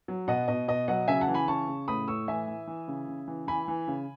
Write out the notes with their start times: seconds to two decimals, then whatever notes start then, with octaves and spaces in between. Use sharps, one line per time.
0.08 F#3
0.28 B2 D#5 F#5
0.48 B2 D#5
0.68 B2 D#5
0.88 F#3 D#5 F#5
1.08 C#3 E5 G#5
1.21 F#5 A5
1.28 E3
1.34 G#5 B5
1.48 C#3 A5 C#6
1.68 C#3
1.88 A2 B5 D#6
2.08 A2 C#6 E6
2.28 E3 E5 G#5
2.48 E3
2.67 E3
2.88 C#3
3.08 C#3
3.28 E3
3.47 E3 G#5 B5
3.68 E3
3.88 C#3